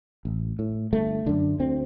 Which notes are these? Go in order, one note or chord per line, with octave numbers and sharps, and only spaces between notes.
A1
A2
G1 A3
F#2 D3 D4
D2 C4